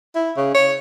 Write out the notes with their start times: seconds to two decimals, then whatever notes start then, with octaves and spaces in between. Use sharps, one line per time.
0.15 E4
0.37 C#3
0.54 C#5